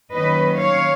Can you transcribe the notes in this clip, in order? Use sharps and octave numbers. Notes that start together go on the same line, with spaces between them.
D#3 F#3 A#3 C#4 B4 D#5
C#5 F5